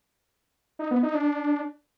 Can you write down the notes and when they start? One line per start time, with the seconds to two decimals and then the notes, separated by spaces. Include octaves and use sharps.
0.79 D#4
0.91 B3
1.03 D#4
1.15 D4